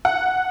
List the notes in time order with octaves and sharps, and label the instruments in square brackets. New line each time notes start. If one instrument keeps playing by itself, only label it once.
[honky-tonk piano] F#5